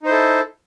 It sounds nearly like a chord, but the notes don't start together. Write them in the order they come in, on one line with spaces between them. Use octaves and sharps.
D#4 C5 E4 A4